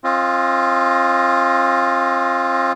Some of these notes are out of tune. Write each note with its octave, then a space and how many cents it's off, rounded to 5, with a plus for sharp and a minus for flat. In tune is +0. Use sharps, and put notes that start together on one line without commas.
C4 +35 F4 +0 D#5 +0